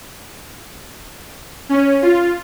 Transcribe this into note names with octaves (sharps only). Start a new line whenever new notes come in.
C#4
F4